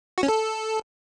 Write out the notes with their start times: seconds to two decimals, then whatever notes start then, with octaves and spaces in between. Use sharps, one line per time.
0.18 F#4
0.23 C#4
0.28 A4